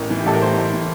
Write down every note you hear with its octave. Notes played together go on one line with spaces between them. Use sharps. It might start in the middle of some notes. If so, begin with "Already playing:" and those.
Already playing: A1 A2 A#4
E3
G4
A1 A4
A#4
A2 C5
A1
E3